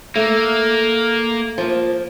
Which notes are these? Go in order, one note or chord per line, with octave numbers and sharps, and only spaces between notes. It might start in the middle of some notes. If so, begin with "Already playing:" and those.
A3 A#3
F3 A#3